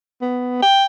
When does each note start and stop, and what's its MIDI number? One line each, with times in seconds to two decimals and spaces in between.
0.21 0.60 59
0.62 0.86 79